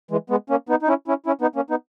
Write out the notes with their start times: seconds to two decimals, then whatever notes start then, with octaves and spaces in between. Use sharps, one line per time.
0.11 E3 G#3
0.30 G#3 B3
0.50 A#3 C#4
0.69 B3 D#4
0.83 D#4
0.88 C#4 E4
1.08 C#4 E4
1.26 C#4 E4
1.41 B3 D#4
1.56 A#3 C#4
1.70 B3 D#4